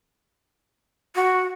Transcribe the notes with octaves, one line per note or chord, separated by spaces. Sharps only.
F#4